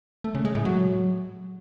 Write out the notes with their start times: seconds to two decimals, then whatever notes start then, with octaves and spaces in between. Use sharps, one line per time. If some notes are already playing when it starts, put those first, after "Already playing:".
0.24 A3
0.35 C#3
0.45 G#3
0.55 A2
0.65 F#3